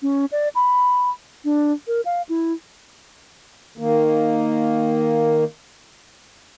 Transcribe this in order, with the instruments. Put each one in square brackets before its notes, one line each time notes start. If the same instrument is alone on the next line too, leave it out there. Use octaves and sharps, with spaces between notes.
[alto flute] C#4
D5
B5
D4
A#4
F5
E4
[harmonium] D#3 A#3